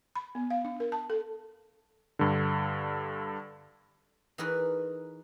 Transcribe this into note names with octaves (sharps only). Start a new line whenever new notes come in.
B5
B3
F5
D4
A#4
A5
A4
G2 D3
E3 D#4 G#4 A#4 B4 C#5